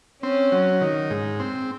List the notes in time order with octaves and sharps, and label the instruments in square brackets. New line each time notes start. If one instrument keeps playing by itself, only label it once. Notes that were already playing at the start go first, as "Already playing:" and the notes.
[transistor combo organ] C4 [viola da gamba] C#4
[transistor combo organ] F#3
D#3
G#2
C4